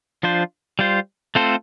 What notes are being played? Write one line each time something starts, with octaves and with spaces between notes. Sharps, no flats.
F3 D4 F4 C5
G3 F4 C5
A3 C4 F4 A4 C5